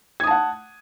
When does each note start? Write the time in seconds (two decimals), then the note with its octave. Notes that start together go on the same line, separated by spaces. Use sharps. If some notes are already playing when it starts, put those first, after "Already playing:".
0.20 G#6
0.24 D#6
0.27 A5
0.31 F#5